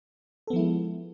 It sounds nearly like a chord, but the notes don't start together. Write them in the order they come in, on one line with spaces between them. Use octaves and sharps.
A4 B3 F3 E4 G#3